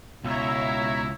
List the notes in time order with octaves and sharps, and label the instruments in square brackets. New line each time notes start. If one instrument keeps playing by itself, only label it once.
[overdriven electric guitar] C#2 [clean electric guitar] B2 [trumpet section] E4 [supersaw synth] C#5 E5 A#5